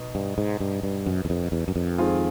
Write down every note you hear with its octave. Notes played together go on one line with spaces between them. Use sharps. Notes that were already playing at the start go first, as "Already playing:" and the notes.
Already playing: B2 D#4
G2
G#2
G2
G2
F#2
E2
F2
E2
F#2
F2
D#3 G#3 C4 F4 G#4